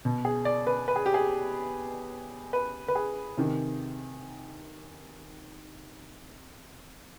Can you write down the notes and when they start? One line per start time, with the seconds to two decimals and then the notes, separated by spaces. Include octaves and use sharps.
0.05 B2
0.25 G#4
0.45 D5
0.67 B4
0.88 B4
0.96 G#4
1.06 G4
1.14 G#4
2.53 B4
2.88 B4
2.95 G#4
3.37 C3 D#3